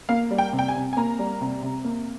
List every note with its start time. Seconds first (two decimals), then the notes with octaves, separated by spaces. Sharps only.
0.09 A#3 F5
0.31 G3
0.38 G5
0.53 C3
0.59 G5
0.68 G#5
0.75 C3
0.93 G#5
0.97 A#3 A#5
1.19 G3
1.41 C3
1.62 C3
1.84 A#3